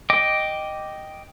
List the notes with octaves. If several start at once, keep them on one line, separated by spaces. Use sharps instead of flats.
D#5 G5 D6